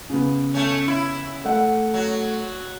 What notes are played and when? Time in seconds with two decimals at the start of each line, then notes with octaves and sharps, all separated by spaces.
0.10 C#3 B3
0.54 A3 C#4
0.88 E4
1.45 A3 F#5
1.94 F#3